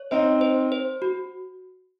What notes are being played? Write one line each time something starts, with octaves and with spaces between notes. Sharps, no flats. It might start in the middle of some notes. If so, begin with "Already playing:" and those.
Already playing: C#5
C4 D#4 C5
C5
C5
F#4